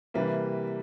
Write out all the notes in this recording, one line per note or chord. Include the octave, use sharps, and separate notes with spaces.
C3 E3 G3 A#3 B4